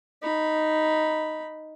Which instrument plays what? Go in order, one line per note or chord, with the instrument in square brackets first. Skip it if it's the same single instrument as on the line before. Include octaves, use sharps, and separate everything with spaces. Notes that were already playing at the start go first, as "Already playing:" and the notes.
[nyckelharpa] D#4 B5